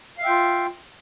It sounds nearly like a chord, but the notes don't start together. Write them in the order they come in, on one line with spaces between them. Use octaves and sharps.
F5 E5 G5 F4